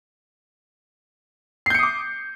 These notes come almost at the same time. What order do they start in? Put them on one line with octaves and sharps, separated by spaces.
C7 G6 C#7 D#6 D6